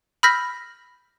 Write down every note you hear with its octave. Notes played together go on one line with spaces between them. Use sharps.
B5 E6 F6 G6 A#6 B6